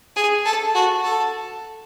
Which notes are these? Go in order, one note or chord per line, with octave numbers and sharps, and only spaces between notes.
G#4
A4
F#4
A4